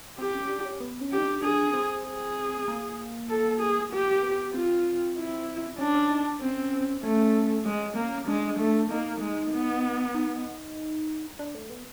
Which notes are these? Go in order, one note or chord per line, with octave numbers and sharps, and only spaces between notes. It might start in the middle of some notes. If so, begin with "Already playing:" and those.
C4 G4
C#4
D4
C#4
B3
C#4
G4
D#4
D4
D4 G#4
C4
G#4
A#3
A4
G#4
A#3 G4
B3
C4 F4
E4
C#4 D4
C#4
D#4
D4
C4 C#4
A3 C#4
G#3 C#4
A#3
G#3 D4
A3
A#3 D#4
G#3
B3
D#4
D4
A3
B3